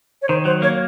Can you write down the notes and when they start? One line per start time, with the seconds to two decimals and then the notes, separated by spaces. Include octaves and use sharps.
0.22 C#5
0.28 D#3 C5
0.45 F#3 C5
0.62 A#3 C#5